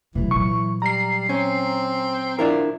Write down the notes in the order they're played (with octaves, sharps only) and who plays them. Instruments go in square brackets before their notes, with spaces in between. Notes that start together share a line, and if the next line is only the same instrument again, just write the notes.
[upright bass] C3 F#3 [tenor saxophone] E3
[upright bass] A#2 F#3 [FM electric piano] C#6
[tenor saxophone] G3 [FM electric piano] A#5 C7
[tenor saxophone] C4 [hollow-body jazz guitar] C#4
[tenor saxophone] F3 [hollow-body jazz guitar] D4 E4 A#4